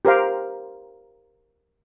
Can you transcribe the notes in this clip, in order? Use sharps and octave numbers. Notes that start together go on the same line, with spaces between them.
G4 A#4 C5 F5